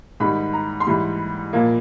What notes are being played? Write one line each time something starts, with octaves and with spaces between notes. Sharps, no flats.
G#2 D#3 G3 B5
A#5
C6
G#2 E3 G3 B5
A#2 F3 A#3